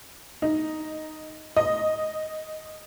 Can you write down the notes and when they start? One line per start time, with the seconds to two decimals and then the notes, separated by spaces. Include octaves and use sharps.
0.42 D#4
1.57 D#5